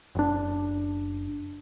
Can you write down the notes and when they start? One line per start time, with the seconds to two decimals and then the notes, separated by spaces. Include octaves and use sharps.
0.15 F#1 D4